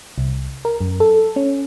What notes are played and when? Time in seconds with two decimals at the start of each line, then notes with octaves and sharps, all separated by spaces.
0.18 C2
0.65 A#4
0.81 F#2
1.00 A4
1.36 C#4